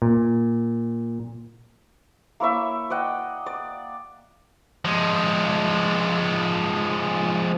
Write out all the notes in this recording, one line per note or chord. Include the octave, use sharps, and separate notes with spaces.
A#2
A#3 E4 C#5 E5
D5 D#5 F#5 G5
D5
F3 G#3